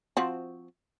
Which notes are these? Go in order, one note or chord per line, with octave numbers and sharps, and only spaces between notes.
F3 C4 F#4